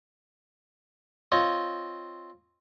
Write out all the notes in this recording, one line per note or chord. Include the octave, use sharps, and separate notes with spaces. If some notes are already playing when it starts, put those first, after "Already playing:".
C4 F4 C#5 D#5